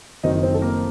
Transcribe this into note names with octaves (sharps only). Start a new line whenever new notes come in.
F#1 F#2 D#3 F#3 C4 D#4 D#5
C4 C5
A4
A#3 A#4